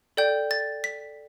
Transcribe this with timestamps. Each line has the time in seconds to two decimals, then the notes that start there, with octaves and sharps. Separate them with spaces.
0.17 A4 D5 G5 G6
0.51 A6
0.84 B6